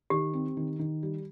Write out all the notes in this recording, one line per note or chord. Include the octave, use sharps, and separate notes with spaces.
D#3 G4
C4
D#3
D#3
G3